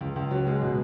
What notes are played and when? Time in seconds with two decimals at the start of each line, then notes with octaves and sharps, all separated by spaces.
0.01 C#2
0.16 C#2
0.31 F#3
0.47 G#3
0.62 B2